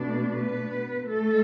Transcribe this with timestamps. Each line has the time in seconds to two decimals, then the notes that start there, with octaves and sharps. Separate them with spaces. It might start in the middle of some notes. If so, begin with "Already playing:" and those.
Already playing: B2 A3 D4
0.31 B3 B4
1.06 A3 A4